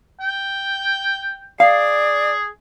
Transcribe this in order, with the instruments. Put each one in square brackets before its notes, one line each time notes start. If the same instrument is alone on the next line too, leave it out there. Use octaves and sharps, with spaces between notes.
[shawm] G5
[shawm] G#4 [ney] D5 [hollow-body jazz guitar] F5